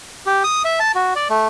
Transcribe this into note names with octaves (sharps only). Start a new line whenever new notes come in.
G4
D#6
E5
A5
F#4
D5
A3